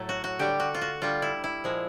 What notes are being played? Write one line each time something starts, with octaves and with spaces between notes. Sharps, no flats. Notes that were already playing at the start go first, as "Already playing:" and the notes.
Already playing: A2 F#3 A3
F#4
F#4
D3 G3 G4
F#4
F4
F#4
D3 G3 F4
E4
E4
A#2 F3 G#3